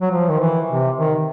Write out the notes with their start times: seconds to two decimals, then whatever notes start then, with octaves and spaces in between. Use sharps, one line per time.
0.01 F#3
0.12 F3
0.29 D#3
0.41 E3
0.70 C3
0.98 D#3